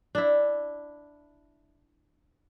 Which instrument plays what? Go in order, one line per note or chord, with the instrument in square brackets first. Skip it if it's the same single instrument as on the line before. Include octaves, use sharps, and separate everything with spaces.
[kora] D4 E4